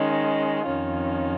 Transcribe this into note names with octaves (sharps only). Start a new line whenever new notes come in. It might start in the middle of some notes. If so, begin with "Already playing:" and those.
Already playing: D#3 G#3 C#4
F2 D#3 C#4 F4